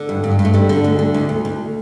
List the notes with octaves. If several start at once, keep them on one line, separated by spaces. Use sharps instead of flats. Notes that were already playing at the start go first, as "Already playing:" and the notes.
Already playing: D3
G2
G2
G2
A3
D3 G3
D3
D2
D3
D2
D2
D2